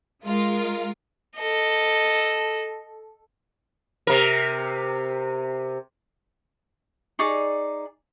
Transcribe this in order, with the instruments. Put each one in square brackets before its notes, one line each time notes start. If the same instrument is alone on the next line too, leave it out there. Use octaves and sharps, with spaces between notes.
[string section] G#3 F4 A#4
[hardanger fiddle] A4 D#5
[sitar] C3 A#4
[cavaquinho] D#4 G#4 D5 C#6